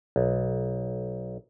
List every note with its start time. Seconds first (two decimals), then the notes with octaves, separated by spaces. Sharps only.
0.16 B1